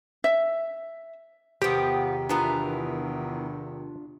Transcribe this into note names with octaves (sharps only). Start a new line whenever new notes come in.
E5
E2 C3 D#3 F3 B3 G4 G5 D#6
E3 B3 D4 F4 A#4